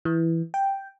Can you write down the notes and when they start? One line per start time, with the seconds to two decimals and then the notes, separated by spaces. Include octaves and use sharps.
0.05 E3
0.54 G5